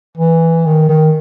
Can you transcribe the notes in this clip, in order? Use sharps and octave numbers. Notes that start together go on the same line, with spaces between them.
E3
D#3
D#3